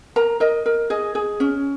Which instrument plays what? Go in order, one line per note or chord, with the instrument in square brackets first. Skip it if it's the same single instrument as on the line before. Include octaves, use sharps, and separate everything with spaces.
[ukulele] A#4 A#5
A#4 D#5
A#4
G#4 D#5
G#4
C#4